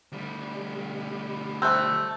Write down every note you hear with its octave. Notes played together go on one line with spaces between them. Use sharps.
D2 G3
A3 C4 E6 F#6 G6